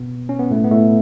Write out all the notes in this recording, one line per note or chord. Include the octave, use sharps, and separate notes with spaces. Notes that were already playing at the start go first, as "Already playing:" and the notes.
Already playing: B2 B3
C#4
B3
A2 A3
B3
A2 A3